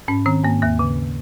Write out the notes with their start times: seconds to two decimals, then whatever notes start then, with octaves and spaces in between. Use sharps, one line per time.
0.08 G#2 C#4
0.26 D#3 C4
0.44 G#2 A#3
0.62 D#2 A#3
0.79 C#3